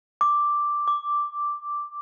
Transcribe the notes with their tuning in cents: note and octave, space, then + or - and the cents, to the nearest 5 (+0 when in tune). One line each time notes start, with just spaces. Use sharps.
D6 +0
D6 -5